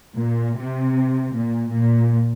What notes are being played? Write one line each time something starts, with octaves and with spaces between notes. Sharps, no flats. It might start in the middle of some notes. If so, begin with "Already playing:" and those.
A#2
C3
A#2
A#2